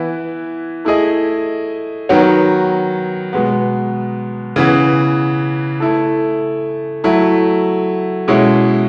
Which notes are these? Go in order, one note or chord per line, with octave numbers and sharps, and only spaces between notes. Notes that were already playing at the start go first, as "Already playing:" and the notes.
Already playing: E3 B3 E4
A3 E4 G#4 D#5
D#3 F#3 B3 F#4 C#5
B2 G#3 B3
C#3 E3 B3
A3 E4 A4
F#3 A3 E4
B2 G#3 C#4 E4